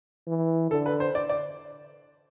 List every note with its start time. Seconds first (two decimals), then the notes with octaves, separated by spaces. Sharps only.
0.27 E3
0.71 D3 A4
0.86 B4
1.00 C5
1.15 D5
1.29 D5